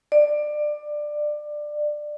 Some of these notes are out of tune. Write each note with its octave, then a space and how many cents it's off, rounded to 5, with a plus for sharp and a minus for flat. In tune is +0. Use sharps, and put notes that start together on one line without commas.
D5 +20